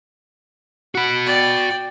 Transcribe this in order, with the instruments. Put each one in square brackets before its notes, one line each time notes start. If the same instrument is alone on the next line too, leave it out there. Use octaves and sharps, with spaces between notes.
[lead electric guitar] F#4 B5 [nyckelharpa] F#5
[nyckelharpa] D5 G5